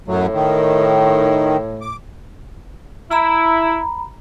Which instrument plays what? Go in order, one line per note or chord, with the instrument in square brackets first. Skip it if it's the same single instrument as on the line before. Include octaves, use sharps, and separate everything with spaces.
[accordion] F#2 F#3 [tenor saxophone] A2
[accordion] D#3
D6
[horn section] E4 [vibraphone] A#5 B5